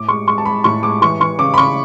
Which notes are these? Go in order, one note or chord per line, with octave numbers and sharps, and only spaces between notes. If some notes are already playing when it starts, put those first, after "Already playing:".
Already playing: A2 D6
G#3 C#6
G#3 C#6
A5
G#3 B5
A2 C#6
G#3 D6
E3 C#6
E3 C#6
C#3 D6
B5
C#3 C#6